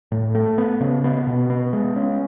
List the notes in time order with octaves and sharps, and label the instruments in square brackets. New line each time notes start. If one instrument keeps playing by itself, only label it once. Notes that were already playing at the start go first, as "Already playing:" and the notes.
[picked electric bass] A2
A3
B3
C#3
B3
B2
B3
G#3
C#4